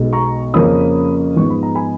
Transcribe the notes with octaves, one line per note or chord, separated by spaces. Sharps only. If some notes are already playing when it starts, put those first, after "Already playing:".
Already playing: B1 B2 G#3 B3
A#5 C#6
F2 C#3 F3 A#3 C#4 B5 D#6
G#2 F3 G#3 B3 C#6
B5
A#5
G#5 B5